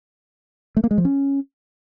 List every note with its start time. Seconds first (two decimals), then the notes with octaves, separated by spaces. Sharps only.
0.77 A3
0.84 A#3
0.91 G#3
0.98 F3
1.05 C#4